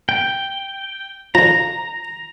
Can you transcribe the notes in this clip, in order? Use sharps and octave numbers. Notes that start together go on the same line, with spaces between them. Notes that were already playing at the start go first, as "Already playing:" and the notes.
G5
D3 F3 A#5